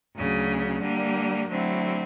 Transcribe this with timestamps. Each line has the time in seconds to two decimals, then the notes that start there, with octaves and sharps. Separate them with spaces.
0.14 D2 C#3 F#3
0.82 D3 G3 A#3
1.48 D3 F#3 A3 C4 E4